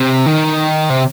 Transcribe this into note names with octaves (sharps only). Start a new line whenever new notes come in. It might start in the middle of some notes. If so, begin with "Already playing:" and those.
Already playing: C3
D#3
C3